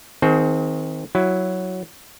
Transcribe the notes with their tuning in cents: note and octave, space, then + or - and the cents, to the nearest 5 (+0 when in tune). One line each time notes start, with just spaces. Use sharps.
D#3 +30 C4 +0 G#4 +40
F#3 +0 E4 +0